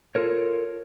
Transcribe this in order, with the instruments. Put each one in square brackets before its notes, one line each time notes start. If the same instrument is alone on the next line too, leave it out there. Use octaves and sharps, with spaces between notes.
[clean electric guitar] F4 A4 A#4 C#5